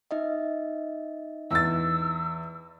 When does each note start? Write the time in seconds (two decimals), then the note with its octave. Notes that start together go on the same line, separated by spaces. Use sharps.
0.11 D#4 D#5 E5
1.51 E2 E6 A6